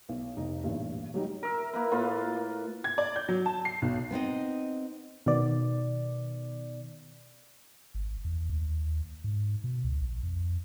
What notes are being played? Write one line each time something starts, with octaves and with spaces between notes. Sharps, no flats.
B1
F1 D#4
A1 E2 G2 A#2
F#3 G3 D#4
A#4 E5
A#3 E4 B4
A2 A#3 F4 B4
G#6
D5
G6
F#3
A5
C7
B1
B3 C4 D#4 D#5
B2 D#3 B3 D5
G#1
E2
D#2
G#2
B2
C#2
A#1
F2